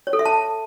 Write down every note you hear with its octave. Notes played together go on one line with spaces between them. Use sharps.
C#5
A4
E5
A5